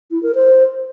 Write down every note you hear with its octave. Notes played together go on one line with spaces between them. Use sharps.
E4
A#4
C5